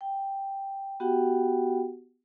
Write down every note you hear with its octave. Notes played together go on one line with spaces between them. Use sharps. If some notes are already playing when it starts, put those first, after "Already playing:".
G5
B3 F#4 G4 F#5 G5